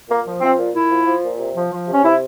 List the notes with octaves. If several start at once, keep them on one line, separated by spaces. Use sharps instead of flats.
A#2 A#3
F3
F3 C4
A#2
A#2 E4
F3
F3
A#2
C3
F3
F3
C3 C#4
C3 E4